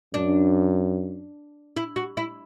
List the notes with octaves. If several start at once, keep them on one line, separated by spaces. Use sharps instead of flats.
F#2 D4
E4
F#4
E4